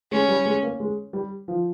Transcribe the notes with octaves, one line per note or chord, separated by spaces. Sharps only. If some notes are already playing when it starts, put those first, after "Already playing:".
G#3 C#4
G3
G#3
A#3
G#3
G3
F3